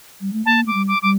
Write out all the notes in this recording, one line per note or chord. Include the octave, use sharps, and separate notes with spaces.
G3
A3
A#3 A5
A3 D6
G3
D6
G3 D6